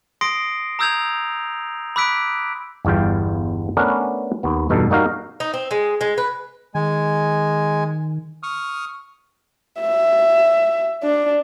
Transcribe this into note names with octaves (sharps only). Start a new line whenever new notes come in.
C6 D#6 A#6 C7 D7
A#5 D#6 E6 G6 G#6 F7
B5 D6 E6 F#6 B6 D7
G1 E2 G2 F4 G5
A3 B3 C#4 D4 A#4 B4
D#2 B3
E2 G2 B2 D#4 A4
G3 A#3 D#4 F#4 A#4 F5
D#4
C4
G#3
G#3
B4
D#3 G#3 G#5
C#6 D#6 F6
E5
D4